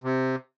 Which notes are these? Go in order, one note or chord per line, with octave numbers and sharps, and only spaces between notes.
C3